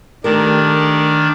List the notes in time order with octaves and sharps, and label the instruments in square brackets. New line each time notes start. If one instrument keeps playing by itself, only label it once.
[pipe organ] D#3 D4 [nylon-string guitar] A3 G4 A#4